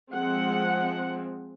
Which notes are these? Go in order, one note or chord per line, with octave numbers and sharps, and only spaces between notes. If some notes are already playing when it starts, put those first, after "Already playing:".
F3 G#3 C4 F#5